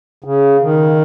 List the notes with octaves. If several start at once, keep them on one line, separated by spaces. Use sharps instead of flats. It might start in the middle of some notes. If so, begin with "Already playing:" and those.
C#3
D#3